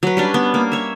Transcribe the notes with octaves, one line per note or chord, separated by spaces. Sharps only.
F#3 B4
G3 C#4 D4
B3
A#3
C#5 E5